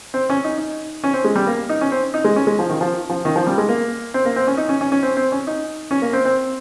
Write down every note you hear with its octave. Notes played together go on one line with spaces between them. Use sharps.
C4
C#4
D#4
D#4
C#4
C4
G#3
G3
A#3
D#4
C#4
C4
D#4
G#3
C#4
G#3
F3
D#3
F3
F3
D#3
F3
G3
G#3
A#3
C4
A#3
C4
C#4
D#4
C#4
C#4
C#4
C4
C4
C#4
D#4
C#4
A#3
C4
C4